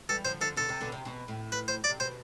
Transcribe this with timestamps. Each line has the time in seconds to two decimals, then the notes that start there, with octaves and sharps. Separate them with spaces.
0.09 E3 G3 A4
0.25 D3 F3 C5
0.41 D3 F3 A4
0.56 B2 D3 A4
0.69 C3
0.81 B2 D3
0.92 C3
1.05 B2
1.28 A2
1.52 B4
1.68 C5
1.84 D5
1.89 C3
2.00 B2 C5